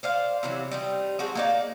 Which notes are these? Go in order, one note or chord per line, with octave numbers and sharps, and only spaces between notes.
C5 D5 F5
C3 E3 F#3
G3 C4 D#4
G#3 C4 D4 F#4
A#3 D#4 D5